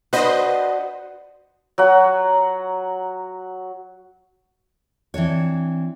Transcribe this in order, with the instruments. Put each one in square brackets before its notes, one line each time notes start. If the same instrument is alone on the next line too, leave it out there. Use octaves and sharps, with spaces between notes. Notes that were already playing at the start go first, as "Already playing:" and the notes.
[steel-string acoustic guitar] D4 F#4 [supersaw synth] B4 C5 D#5
[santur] F#3 F#5
[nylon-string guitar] E3 C4 D4 C#5